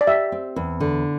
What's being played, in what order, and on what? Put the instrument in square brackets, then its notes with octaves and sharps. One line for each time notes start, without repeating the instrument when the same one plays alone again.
[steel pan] D5
[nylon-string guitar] G4 [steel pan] E5
[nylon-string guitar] C4
E2
D3